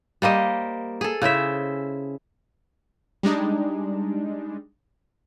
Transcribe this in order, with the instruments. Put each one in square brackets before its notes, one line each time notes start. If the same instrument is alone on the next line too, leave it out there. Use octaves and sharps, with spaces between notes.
[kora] G3 A#3 C5 D#5
G#4 A4
C#3 E4 C5 E5
[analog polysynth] G3 G#3 D4 D#4